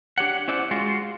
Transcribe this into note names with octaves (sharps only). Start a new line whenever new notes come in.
D4 G4 C#5 F#5
C#4 E4 C5 D5 E5 F#5
G#3 F4 F#4